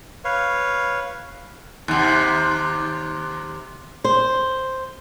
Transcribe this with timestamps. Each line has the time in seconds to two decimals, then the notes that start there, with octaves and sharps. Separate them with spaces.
0.25 B4 C#5 F5
1.88 D#2 C3
4.04 C5